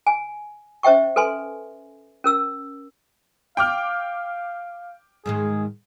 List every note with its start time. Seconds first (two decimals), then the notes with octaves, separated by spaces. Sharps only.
0.07 G#5
0.83 C#4 C5 E5 G5 C#6
1.16 A4 B4 G#5 C6
2.24 C#4 A#4 E6
3.57 F5 G5 D6 F6
5.26 G#2 D#3 G#3 G#4